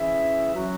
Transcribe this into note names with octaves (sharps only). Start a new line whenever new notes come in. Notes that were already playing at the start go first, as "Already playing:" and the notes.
Already playing: E3 C#4 E4 G#4 E5
F#3 C#4 F#4